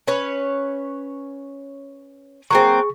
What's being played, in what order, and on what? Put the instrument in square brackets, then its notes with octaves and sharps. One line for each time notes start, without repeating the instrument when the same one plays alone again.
[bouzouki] C#4 B4 C#5
[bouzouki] F#3 A#3 C4 [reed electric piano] G#4 C#6